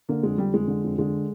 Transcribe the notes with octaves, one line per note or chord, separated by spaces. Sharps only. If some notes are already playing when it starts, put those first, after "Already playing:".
D3 A#3
F2 G#3
D3 G3
F2 G#3
D3
F2
D3 G#3